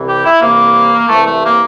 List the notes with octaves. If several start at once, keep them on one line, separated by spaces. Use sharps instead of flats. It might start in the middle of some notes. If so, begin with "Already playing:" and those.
Already playing: C2 C3 E3
G4
E4
C2 C3 E3 A#3
C2 C3 E3 A3
A3
A#3